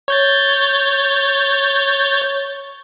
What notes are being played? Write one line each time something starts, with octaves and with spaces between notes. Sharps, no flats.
C#5 G6 A6